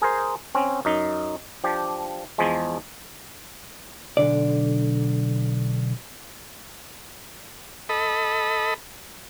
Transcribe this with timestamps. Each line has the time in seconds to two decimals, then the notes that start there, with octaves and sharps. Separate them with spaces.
0.02 G#4 A#4 C5
0.55 C4 C#4
0.85 F#2 D#4
1.64 F3 D4 G4
2.38 E2 F3 G#3
4.17 B1 G#2 D3 D5
7.89 A4 D#5 B5